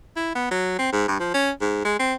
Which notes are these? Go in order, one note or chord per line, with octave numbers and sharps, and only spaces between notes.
E4
B3
F#3
C4
G#2
G2
F3
C#4
G#2
G#3
C4